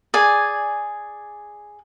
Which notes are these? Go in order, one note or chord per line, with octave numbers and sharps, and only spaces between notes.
G#4 D5 G#5